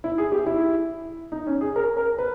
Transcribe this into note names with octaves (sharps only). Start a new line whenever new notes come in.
E4
G#4
G4
E4
D#4
C#4
G#4
A#4
A#4
B4